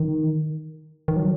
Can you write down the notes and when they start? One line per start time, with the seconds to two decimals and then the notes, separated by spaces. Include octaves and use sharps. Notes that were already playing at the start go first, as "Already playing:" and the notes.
Already playing: D#3
1.08 D#3
1.16 F#3